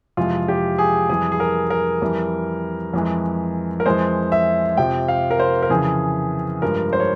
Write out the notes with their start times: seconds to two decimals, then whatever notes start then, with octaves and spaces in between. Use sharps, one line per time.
0.17 F2 C3 E3 G#3 F4
0.48 G4
0.78 G#4
1.09 F2 E3 G3 G#4
1.32 G#4
1.40 A#4
1.70 A#4
2.02 F2 E3 G3
2.93 F2 E3 G#3
3.80 A#4
3.86 F2 E3 G#3 C5
4.32 E5
4.77 F2 C3 F3 G5
5.08 F5
5.31 A#4
5.40 C5
5.62 A#4
5.70 F2 C#3 E3 G#4
6.62 G2 F3 G#3 A#4
6.93 C5
7.00 C#5